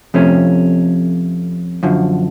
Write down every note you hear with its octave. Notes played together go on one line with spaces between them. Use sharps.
F2 C3 F3 A3 C#4
F#2 D3 F3